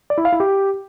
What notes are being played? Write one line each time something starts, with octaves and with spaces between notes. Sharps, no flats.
D5
E4
F5
E4
G4